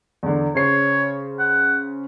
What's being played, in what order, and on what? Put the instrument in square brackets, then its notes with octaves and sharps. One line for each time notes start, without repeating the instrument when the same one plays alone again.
[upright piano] E2 D3
[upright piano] C#3 C5 C7 [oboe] C#5
[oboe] F#5